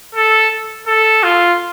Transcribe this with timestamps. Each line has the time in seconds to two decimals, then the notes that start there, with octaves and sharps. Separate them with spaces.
0.15 A4
0.87 A4
1.23 F4